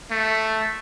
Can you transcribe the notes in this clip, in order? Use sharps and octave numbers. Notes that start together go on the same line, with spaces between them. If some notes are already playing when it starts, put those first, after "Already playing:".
A3